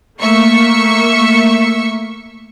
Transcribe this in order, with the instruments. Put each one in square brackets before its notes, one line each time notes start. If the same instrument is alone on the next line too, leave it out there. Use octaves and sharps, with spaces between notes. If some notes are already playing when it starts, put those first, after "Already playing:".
[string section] A3 A#3 E5 C#6 C#7